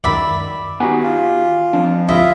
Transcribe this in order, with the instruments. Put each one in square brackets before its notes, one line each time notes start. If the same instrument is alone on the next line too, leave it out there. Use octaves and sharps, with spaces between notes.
[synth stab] C#2 F#2 D#3 [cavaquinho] D5 E5 B5
[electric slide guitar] D#3 G4 G#5 [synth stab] B3 D#4 F#4
[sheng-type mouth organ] F4
[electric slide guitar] F3 C4 C5 [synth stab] D4
[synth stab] G1 C#2 [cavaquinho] E4 D#5 [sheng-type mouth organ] F4 E5